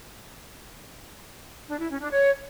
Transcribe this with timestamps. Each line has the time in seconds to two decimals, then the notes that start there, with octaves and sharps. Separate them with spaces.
1.68 D4
1.78 E4
1.89 C#4
2.00 D4
2.11 C#5